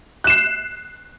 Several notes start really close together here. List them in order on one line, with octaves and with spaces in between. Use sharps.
F#6 E7 C7